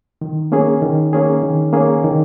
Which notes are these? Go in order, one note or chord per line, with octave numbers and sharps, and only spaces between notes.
D#3
A#3 C#4 G#4
D#3
A#3 C#4 G#4
D#3
A#3 C#4 G#4
D#3